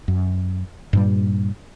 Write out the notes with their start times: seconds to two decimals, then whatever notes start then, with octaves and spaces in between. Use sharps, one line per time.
0.08 F#2
0.93 G2 A#2 G3